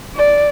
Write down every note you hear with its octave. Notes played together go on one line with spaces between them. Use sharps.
D5